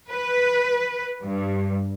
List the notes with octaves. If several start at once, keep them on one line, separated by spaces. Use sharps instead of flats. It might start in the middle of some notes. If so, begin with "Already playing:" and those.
B4
G2